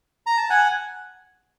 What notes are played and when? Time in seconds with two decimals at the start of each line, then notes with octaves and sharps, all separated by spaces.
0.27 A#5
0.38 A5
0.50 F#5 G#5